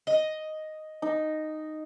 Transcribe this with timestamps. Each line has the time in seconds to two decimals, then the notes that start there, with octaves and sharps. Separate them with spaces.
0.07 D#5
1.02 D#4